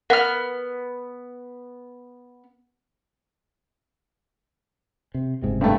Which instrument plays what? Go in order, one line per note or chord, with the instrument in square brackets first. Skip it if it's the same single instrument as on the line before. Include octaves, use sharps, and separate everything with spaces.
[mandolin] B3 F6 [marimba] A#4 [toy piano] F#5
[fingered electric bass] C3
F#1 G#2 C3
[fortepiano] G2 A3